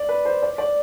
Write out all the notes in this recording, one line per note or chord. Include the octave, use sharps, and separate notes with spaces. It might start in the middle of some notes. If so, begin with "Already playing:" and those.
Already playing: D5
B4
C5
D5
D5